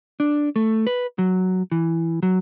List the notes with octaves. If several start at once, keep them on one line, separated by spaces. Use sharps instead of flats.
D4
A3
B4
F#3
E3
F#3